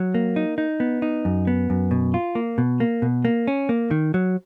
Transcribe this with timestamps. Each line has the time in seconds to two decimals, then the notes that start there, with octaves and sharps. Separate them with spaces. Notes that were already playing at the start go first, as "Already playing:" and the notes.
Already playing: F#3
0.14 A#3
0.36 D#4
0.58 D#4
0.80 B3
1.02 D#4
1.25 F#2
1.47 B3
1.70 F#2
1.91 B2
2.14 F4
2.35 A#3
2.58 B2
2.80 A#3
3.02 B2
3.25 A#3
3.47 C#4
3.69 A#3
3.91 D#3
4.14 F#3